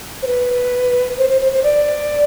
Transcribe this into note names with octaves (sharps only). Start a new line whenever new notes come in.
C5
B4
C5
C5
C5
C5
D5